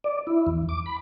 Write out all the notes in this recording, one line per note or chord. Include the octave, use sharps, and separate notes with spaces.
D5
E4
E2
D6
B5